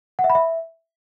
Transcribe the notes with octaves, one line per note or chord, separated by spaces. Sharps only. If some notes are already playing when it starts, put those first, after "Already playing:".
F#5
E5
B5
E5